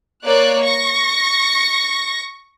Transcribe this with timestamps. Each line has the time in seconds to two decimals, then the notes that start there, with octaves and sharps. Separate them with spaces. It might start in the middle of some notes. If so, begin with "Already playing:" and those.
0.25 A#3 C#5 D5 F#6
0.63 C#6 A#6